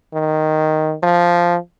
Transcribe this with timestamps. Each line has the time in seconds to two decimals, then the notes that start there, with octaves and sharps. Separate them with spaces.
0.14 D#3
1.03 F3